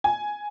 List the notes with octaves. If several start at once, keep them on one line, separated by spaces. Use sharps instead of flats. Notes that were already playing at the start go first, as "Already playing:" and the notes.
G#5